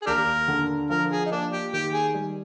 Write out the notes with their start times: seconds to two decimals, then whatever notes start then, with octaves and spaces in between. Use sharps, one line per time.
0.02 G#4
0.07 D#2 D4 G4 A#4
0.48 D3
0.90 F3 A#4
1.11 G#4
1.26 D#4
1.31 A#3 D4
1.53 G4
1.73 D#3 G4
1.93 G#4
2.14 G3